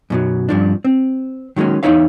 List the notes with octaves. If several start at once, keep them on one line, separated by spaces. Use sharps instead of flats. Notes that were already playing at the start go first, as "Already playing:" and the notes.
F#2 B2 F#3
G2 F3 D4
C4
D#3 F#3 G#3 A#3 C#4
E2 F3 D#4 E4 C#5 F5